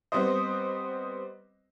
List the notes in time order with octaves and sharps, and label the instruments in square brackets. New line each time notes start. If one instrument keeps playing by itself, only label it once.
[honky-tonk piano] G3 B3 C4 C5 D#5